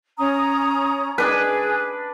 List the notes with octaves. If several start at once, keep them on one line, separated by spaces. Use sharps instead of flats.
C#4 A#5 D#6
D4 G#4 B4